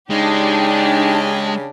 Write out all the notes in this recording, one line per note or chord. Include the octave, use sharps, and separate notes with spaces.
C#3 G#3 D4 D#4 G4